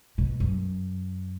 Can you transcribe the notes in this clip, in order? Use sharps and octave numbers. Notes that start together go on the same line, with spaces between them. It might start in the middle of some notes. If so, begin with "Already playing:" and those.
B2
F#2